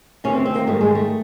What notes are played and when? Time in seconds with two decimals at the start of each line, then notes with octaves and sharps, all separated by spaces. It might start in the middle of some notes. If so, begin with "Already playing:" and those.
0.24 D2 C3 D#3 C#4
0.35 C4
0.45 C4
0.55 A#3
0.67 G#2 D#3 G3 A3
0.81 G#3
0.95 A3